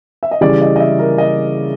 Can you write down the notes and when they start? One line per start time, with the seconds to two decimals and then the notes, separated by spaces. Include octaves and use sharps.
0.23 E5
0.31 D#5
0.41 C#3 E3 G3 D5
0.62 D#5
0.76 D#5
0.80 E5
0.99 A#4
1.18 D#5